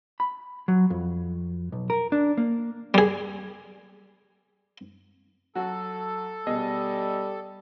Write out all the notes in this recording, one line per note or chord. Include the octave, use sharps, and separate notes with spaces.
B5
F#3
F2
B1
A#4
D4
A#3
G3 G#4
F#3 F#4 A4
B2 G3 G#4 D#5